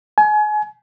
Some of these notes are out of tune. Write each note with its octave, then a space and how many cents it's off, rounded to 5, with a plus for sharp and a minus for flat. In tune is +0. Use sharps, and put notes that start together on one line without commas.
G#5 +30